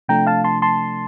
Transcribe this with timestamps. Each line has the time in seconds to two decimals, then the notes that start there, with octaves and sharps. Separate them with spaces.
0.08 C3 F3 A3 D4 G5 A#5
0.27 F5 A5
0.44 A5 C6
0.62 A5 C6